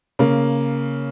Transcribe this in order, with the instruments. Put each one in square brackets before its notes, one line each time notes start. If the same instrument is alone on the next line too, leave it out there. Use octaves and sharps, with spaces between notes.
[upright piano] C#3 A#3